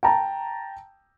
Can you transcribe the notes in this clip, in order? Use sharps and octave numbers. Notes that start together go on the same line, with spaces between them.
G5 A5 A#5